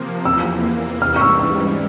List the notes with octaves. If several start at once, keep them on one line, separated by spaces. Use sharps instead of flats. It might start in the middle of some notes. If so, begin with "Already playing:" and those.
Already playing: C3 F3 A#3
E2 C3 E3 A#3 E6
G#2 E3 G3 F6
C#6
E6
E6